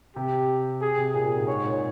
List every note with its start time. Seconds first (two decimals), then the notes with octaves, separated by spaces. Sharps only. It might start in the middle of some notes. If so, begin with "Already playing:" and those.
0.16 C3 G4
0.81 G#4
0.98 C3
1.14 A#2 G#4
1.26 A#2
1.37 G#2
1.47 G#2 C#5
1.64 A#2